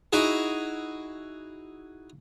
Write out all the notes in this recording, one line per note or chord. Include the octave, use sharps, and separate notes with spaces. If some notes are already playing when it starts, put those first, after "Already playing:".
D#4 E4 F#4 G#4